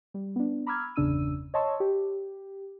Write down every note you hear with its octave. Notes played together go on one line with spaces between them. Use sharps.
G3
B3 D4
A#5 B5 D6 E6 F6 G#6
G1 E2 C#3 D4 E6 D#7
C#5 D#5 A5 C6 C#6 E6
G4